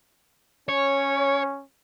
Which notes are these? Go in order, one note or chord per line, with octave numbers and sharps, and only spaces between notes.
C#4 C#5